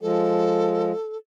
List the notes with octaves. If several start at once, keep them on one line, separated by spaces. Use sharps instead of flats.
F3 G#3 A4